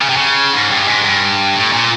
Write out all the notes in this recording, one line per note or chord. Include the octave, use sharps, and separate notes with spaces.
C#3
C3
C#3
G#2
G2
G#2
G2
A2
A#2